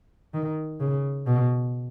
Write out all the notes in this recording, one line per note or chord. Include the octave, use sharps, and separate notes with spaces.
D#3
C#3
B2